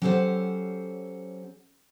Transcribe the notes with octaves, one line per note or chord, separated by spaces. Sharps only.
F#3 C#4 G4 A4 C5 F#5